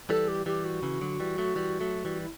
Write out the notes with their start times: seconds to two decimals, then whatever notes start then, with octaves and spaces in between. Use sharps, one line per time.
0.09 E3 G3 A4
0.28 G4
0.46 E3 G3 G4
0.65 F#4
0.82 C#3 E3
1.01 D3 F#3
1.20 E3 G3
1.38 F#3 A3
1.56 E3 G3
1.80 F#3 A3
2.05 E3 G3
2.21 E4